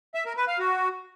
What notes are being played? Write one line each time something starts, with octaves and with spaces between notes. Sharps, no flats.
E5
A#4
B4
F5
F#4